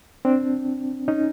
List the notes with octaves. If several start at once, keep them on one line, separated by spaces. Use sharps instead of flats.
C4 D4
C#4 D#4